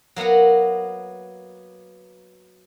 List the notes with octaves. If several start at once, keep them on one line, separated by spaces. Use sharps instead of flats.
F#3 A#3 B3 A#4 F#5